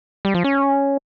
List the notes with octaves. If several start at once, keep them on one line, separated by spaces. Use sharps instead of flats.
G3
F3
C#4